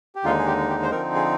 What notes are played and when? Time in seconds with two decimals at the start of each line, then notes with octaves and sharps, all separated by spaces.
0.15 G4
0.24 D#2 D3 G#3 D#4 F4
0.38 G#4
0.47 G4
0.69 G4
0.82 C5
0.91 D3 F3 C4 D#4 A#4
1.15 G#4